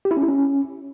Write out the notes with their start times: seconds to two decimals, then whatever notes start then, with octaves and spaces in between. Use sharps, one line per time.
0.05 G4
0.11 E4
0.17 C#4
0.23 E4
0.28 C#4